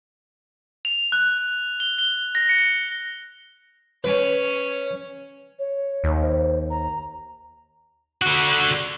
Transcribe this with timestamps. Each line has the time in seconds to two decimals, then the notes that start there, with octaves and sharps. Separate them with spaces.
0.85 F7
1.12 F#6
1.80 G7
1.99 G7
2.35 A#6
2.49 C#7
4.04 C#4 B4 C#5
5.59 C#5
6.04 D#2
6.22 C5
6.70 A#5
8.22 D3 F#4